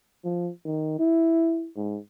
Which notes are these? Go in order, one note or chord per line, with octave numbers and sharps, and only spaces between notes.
F3
D#3
E4
G#2